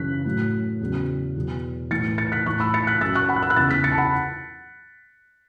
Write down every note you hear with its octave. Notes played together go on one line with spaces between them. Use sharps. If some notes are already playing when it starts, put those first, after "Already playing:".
Already playing: F#2 C#3 E3 F#6 B6
A2 F#3
E2 C#3 F#3
E2 B2 F#3
A2 E3 A6 C#7
A6 C#7
F#6 B6
A2 E3 C#6 F#6
B5 E6
A6 C#7
F#6 B6
F#2 F#3 E6 A6
C#6 F#6
F#5 B5
F#6
B5 E6
F#6
E2 C#3 E3 E6 A6
F#6 B6
A6 C#7
A5
F#5 B5